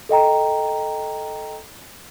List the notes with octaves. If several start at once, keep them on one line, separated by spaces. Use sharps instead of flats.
A4 D#5 G5 A#5